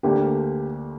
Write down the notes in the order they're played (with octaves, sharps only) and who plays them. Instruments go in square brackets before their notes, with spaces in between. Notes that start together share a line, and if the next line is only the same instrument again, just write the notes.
[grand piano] D2 D3 A#3 [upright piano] G4